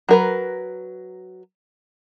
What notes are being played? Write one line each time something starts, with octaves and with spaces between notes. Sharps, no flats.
F#3 A#4 B4